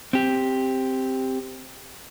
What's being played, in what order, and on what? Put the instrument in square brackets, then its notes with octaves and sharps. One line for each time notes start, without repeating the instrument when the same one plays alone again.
[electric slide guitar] C4 G4